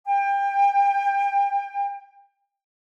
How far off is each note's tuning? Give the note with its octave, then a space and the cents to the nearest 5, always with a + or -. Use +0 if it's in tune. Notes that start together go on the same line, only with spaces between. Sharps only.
G5 +25